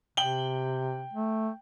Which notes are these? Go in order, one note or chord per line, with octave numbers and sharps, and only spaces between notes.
C3 G5 F#7 G7
A3